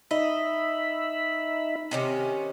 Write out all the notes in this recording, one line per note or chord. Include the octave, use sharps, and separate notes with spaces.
D#4 D#5 E5 B5
C3 D#3 C#4